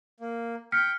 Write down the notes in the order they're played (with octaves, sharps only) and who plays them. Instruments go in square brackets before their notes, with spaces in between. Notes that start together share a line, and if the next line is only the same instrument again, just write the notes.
[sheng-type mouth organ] A#3
[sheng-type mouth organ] G5 [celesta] F6 B6 C#7